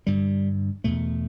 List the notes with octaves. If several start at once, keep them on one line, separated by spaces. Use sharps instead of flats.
G2 D3 G3
E2 B2 A3